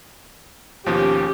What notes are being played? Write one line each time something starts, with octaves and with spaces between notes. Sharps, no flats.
D#2 B2 F3 C#4 G4